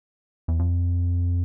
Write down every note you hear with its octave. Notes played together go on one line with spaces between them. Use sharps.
E2
F2